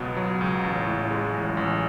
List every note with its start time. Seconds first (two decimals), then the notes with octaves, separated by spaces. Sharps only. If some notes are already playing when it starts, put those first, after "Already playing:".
Already playing: C#2 B2 F#3 B3
0.17 F#3
0.41 C#2
0.63 A1
0.87 A2
1.11 G#3
1.33 A1
1.57 A1